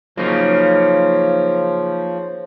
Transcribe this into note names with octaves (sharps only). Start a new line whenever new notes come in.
C#3 F3 F#3 A#3 D#4